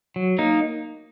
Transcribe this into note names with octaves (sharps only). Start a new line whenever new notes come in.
F#3
A#3 D#4